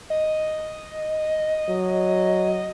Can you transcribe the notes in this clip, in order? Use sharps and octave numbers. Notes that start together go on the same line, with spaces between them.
D#5
F#3